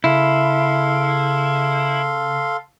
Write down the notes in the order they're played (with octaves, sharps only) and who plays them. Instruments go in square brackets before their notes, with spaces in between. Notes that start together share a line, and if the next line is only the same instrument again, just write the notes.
[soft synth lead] C#3 [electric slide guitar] E4 [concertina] A4 F5 C6